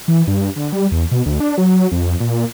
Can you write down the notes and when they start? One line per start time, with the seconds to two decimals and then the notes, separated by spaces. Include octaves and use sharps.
0.08 E3
0.27 G2
0.56 D3
0.73 G3
0.92 E2
1.11 B2
1.26 D2
1.40 D4
1.58 F#3
1.92 F2
2.20 A#2